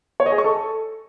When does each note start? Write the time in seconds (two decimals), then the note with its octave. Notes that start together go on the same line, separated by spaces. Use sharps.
0.20 C#5
0.26 D#5
0.32 G#4
0.38 C#6
0.44 A4